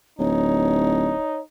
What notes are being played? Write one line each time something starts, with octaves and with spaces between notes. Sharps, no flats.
D1 D#4 C#5